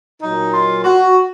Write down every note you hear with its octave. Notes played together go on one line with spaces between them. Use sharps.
A#2 F#3 D#4
F4
F#4